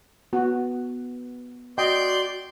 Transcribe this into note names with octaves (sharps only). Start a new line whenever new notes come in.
B3 F#4
F#4 D5 D#5 G5 C6 G6